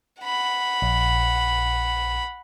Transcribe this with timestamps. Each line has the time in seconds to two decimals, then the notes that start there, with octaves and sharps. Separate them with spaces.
0.22 F#5 B5
0.82 A#1